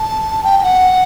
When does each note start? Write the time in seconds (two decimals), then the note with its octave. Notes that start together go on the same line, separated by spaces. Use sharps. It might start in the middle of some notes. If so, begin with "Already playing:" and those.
Already playing: A5
0.44 G5
0.59 G5
0.63 F#5